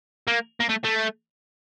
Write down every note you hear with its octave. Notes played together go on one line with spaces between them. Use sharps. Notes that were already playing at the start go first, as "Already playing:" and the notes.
A#3
A#3
A3
A3